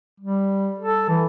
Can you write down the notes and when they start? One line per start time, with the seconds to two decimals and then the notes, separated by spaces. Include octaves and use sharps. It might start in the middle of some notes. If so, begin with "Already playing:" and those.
0.20 G3
0.79 A4
1.09 E3